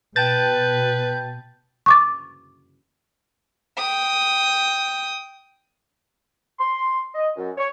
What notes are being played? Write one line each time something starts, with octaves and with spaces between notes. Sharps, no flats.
B2 B4 G5 A5 G6 A6
C#6 D6 A6
G5 D#6
C6
D#5
F#2
C#5